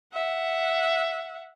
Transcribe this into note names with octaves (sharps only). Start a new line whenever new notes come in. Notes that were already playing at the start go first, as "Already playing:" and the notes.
E5 F#5